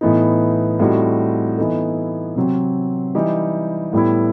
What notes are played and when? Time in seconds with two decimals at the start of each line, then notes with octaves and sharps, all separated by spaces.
0.01 A2 E3 B3 D#4
0.79 A2 G3 C4 D#4 F#4
1.58 E3 B3 D#4 A4
2.36 C3 F#3 C4
3.15 E3 G3 D#4 G4
3.93 A2 G3 B3 E4